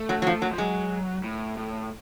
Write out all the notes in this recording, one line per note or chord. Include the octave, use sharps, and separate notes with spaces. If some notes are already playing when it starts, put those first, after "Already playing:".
Already playing: A3
F#3
F#3
F3
F#3
F3
F#3 G#3
A2
A2